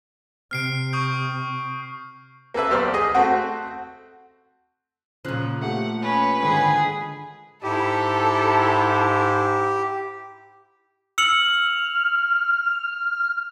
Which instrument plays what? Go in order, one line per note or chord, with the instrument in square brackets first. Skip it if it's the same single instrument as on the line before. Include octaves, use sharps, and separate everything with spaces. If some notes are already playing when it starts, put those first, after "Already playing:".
[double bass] C3 [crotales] F6 C7 D7
[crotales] C#6 D#6 G6
[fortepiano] A#3 A4 B4 E5
B1 G4 C5 D5 F6
G#4 D#5
A3 C4 F#4
[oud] A#2 F3 [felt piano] C#3 F#6
[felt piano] A3 G4 [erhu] F#5
[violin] C#4 [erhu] B4
[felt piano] G#2 D3 D#3 [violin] G#4
[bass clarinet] G#2 [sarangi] E4 [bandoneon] G4 [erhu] A4
[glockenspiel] E6 C#7 F#7 [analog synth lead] F6